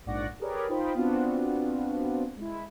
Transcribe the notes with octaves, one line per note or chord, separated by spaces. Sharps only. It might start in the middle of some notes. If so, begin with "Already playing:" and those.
A#1 G#2 D5 F#5 C#6 A#6
G4 G#4 A#4 B4 C#5 D5
D#4 F4 C5 G5 B5
B3 C4 D4 F4 F#4
G#3 E4